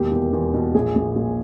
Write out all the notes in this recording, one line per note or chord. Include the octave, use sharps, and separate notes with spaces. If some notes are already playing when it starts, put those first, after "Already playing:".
Already playing: E1 D#2 G4
E2
E2
B2
A#1 G#4
A#1
A#1